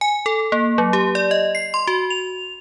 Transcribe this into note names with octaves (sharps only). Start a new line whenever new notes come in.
G#5
A4
A#3
F#3
G4
D5
D#5
C7
C6
F#4
F7